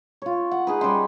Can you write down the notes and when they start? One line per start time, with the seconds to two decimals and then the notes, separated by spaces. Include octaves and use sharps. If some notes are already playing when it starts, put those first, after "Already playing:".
0.22 F4 C#5
0.51 F#5
0.67 D#4 G#4 B4
0.81 G3 C#4 C6